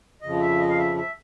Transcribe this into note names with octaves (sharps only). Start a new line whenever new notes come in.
F2 C#3 F3 D#5
E5
D#5
F5
E5
E5